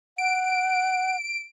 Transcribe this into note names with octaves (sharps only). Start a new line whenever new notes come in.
F#5 D7